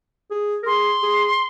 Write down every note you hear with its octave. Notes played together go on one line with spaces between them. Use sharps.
G#4
A#4
G#4 C6
G#4